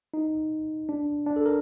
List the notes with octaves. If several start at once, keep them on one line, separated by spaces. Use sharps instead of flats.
D#4
D4
D4
A4
A#4